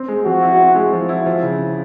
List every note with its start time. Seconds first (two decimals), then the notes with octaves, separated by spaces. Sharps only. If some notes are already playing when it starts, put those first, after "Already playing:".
Already playing: C4
0.08 G#3
0.25 F3 F#4
0.43 E4
0.59 C4
0.76 G#3
0.93 F3
1.09 E4
1.26 F3
1.43 C#3